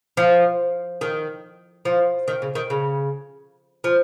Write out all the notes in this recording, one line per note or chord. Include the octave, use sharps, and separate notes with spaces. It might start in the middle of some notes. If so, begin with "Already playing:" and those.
F3
D#3
F3
D#3
C#3
D#3
C#3
F3